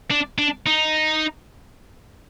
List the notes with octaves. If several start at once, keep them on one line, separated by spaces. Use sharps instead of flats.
D4
D4
D#4